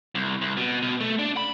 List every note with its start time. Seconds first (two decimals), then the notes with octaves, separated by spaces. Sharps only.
0.15 C2
0.42 C2
0.57 B2
0.82 B2
1.00 A3
1.19 D4
1.37 B5